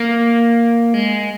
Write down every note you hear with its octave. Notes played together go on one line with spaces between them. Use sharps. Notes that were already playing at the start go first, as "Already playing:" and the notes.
Already playing: A#3
G#3